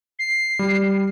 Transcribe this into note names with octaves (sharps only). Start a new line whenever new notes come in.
C7
G3